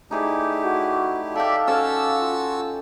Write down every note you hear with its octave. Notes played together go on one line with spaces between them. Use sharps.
A3 D#4 E4 G4 G#4 D5
F#4
G4 A4 D5 E5 F5
C#4 F#4 A4 C#5 A5 E6
F4